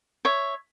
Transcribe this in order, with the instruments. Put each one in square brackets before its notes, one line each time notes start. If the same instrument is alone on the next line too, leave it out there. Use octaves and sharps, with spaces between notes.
[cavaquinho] C#5 E5